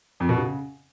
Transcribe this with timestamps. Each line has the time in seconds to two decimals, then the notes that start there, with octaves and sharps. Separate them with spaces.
0.20 F2
0.29 B2
0.38 C#3